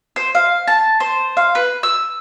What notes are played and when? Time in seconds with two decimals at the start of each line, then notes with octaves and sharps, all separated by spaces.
0.16 C5
0.35 F5
0.68 A5
1.00 C5
1.37 F5
1.55 B4
1.83 E6